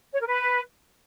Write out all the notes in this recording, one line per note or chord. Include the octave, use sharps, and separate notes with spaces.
C#5
A#4
B4